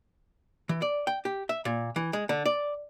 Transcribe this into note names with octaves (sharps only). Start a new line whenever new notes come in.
E3
D5
G5
G4
E5
A#2
E3
G#3
D3
D5